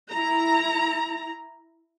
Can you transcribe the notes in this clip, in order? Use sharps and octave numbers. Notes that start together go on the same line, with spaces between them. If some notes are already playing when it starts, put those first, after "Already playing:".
E4 A#5